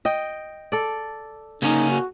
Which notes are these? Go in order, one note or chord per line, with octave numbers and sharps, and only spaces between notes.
D#5 G5
A4 D5
C#3 A#3 C#4 D#4
F#4